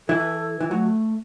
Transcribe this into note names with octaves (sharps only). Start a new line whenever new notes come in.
E3 E4 A4
E3
F#3 A3